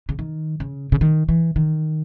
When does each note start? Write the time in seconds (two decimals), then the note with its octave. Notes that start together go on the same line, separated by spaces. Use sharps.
0.09 C#3
0.19 D#3
0.60 C#3
0.92 C#3
1.01 D#3
1.29 E3
1.56 D#3